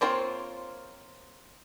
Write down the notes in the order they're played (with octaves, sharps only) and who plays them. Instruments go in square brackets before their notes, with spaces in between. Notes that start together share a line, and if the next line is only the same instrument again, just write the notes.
[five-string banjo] A#3 C4 F4 C5 C#5